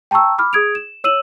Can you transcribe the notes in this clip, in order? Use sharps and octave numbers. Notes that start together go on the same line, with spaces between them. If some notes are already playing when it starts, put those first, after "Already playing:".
G5 A5 A#5 C#6 E6
B5 D6 F6
G#4 D#6 G#6 D7 F7
E7
C#5 E6 D#7 E7 F#7